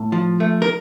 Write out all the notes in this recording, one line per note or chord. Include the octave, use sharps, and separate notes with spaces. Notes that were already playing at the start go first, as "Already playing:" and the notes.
Already playing: A2
F3
A3
A#4